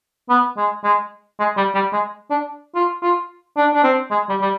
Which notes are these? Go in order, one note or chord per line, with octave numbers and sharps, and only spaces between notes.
B3
G#3
G#3
G#3
G3
G3
G#3
D4
F4
F4
D4
D4
C4
G#3
G3
G3